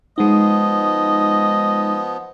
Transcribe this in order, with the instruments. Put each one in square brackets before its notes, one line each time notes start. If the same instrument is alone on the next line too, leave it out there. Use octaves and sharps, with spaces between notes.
[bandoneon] F3 B3 [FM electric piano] G#3 D#4 [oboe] D#5